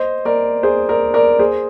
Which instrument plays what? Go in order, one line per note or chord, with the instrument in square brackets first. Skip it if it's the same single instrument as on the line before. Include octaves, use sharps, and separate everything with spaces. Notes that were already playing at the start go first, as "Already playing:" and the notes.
Already playing: [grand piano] C5 D#5
A#4 D5
G#4 C5
A#4 D5
A#4 D5
G#4 C5